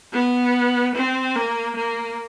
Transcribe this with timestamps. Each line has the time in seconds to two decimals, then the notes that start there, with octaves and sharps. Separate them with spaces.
0.13 B3
0.95 C4
1.35 A#3
1.76 A#3